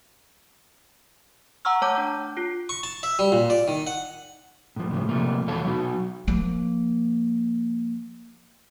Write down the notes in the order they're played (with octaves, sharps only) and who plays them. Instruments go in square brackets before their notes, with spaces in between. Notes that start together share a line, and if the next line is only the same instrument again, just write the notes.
[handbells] F#5 A#5 C#6 E6 F6
A3 C#5 A5 D6 G6
D4 G6
F4 C7
[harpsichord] C#6
A5
E5
G3
A#2
D5
D#3
F#5
[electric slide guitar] A2 F3
A2 C#3 E3 F3
C3 F3 A3 A#3
E2 B2 A4 C#5 F5 A5
F#3 B3 D#4 F#4
[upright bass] F3 A#3